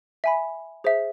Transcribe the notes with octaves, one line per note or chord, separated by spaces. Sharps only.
E5 G#5 B5
G#4 C5 E5